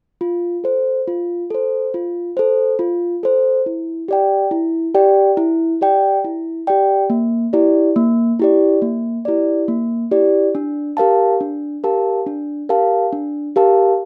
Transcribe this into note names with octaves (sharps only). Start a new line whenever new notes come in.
F4
A4 C5
F4
A4 C5
F4
A4 C5
F4
A4 C5
E4
G4 D5 G5
E4
G4 D5 G5
E4
G4 D5 G5
E4
G4 D5 G5
A#3
E4 G4 D5
A#3
E4 G4 D5
A#3
E4 G4 D5
A#3
E4 G4 D5
D4
G4 A#4 F5 A5
D4
G4 A#4 F5 A5
D4
G4 A#4 F5 A5
D4
G4 A#4 F5 A5